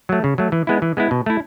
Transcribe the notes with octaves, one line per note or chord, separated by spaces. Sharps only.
F#3 A3
C#3
F#3 A3
E3
G#3 B3 E4
E3
G#3 B3 E4
B2
A3 E4